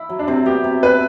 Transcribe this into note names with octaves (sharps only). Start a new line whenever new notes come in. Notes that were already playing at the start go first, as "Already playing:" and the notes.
Already playing: E4
F#3
D4
C3 C4
B3 G4
C3
E4 B4